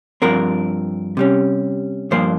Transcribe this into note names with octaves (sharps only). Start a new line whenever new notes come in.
G2 F3 C4 A#4
C3 G3 C#4
G2 F3 A#3 C5